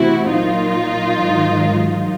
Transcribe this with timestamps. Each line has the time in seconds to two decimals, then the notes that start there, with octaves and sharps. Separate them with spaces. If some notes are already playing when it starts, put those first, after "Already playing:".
Already playing: C3 E3 A3 C4 E4 F#4
0.31 A#2 F#3 A#3 D#4 F4
1.19 G#2 D#3 F#3